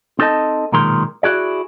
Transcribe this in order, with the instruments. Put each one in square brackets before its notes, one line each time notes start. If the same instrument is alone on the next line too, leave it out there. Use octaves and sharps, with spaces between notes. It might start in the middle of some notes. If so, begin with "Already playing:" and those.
[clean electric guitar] C4 D#4 A4 B4 D#5 A5
B1 A#2 D#3 G#3 A#4 C6
E4 F#4 G#4 D5